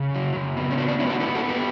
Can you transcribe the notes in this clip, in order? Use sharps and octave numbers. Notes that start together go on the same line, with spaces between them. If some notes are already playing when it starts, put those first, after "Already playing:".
Already playing: C#3
F#3
C#3
B3
C#4
F#3 D4
D4
B3 C#4 E4
G4
D4 F#4
B3 E4 G4
F#4 A4
B3
G4 B4